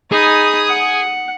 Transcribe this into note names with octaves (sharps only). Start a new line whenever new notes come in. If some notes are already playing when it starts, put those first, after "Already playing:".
D#4 G#4 B5 D#6
F#5